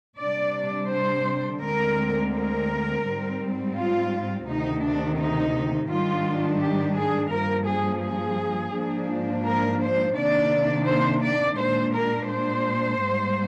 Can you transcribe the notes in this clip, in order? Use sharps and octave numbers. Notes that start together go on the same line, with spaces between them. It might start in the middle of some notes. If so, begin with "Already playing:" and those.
C3 G3 D4 D5
C5
D2 D3 G#3 C4 A#4
A#4
G#2 G3 C4
F4
D2 C3 D#3 D#4
D4
D#4
G#2 D#3 G3 D4 F4
G4
G#4
G2 F3 A#3 A#4
G#4
G#4
G#2 F3 A#3 D4
A#4
C5
C3 D#3 A#3 D4 D5
C5
D5
A#2 G#3 D4 C5
A#4
C5
G#2 G3 A#3